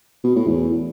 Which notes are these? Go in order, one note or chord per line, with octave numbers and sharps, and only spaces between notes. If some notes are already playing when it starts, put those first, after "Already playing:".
B2
A2
E2